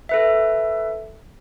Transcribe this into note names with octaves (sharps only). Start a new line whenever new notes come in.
A4 B4 E5